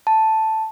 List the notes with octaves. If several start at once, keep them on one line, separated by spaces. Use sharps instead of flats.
A5